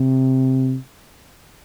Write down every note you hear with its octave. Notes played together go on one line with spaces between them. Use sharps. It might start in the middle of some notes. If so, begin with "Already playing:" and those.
Already playing: C3